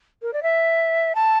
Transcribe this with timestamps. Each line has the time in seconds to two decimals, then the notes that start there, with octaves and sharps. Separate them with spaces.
0.22 A#4
0.33 D5
0.43 E5
1.15 A5